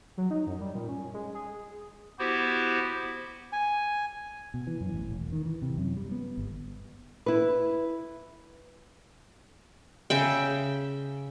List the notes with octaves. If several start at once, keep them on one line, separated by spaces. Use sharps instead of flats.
F#3
D#4
F#2
G3
A#2
C#4
G#3
G#4
B3 E4 F#4 G4 C5
G#5
B2
E3
F#2
A1
E1
D#3
E3
C3
F#2
G3
B3
G1
E4 B4
C#3 E5 G5